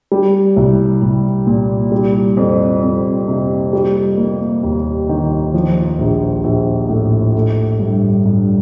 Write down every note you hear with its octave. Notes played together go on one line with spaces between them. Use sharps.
G3
C2
C2
A#2
G3
F2
F2
C3
G3
A#3
D#2
D#3
F3
A#1
A#1
A2
A3
G2
G2